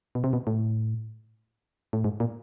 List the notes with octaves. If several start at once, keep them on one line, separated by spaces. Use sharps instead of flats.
B2
C3
B2
A2
A2
G#2
A#2